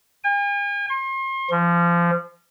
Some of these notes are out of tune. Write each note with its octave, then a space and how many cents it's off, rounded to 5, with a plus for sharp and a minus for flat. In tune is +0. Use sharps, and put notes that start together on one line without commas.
G#5 -45
C6 +40
F3 -25